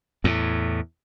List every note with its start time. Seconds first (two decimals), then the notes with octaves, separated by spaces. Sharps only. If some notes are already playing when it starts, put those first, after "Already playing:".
0.24 E2 A2